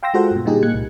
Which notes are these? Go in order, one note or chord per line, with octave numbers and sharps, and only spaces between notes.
F5 G5 C6 E6 A#6
G#3 F4 F#4 A4 C5 F#5
G2 B2
A#2 D3 G3 D#4 G4 G#4
A2 A#3 F#6 G#6 C#7
C2 A#2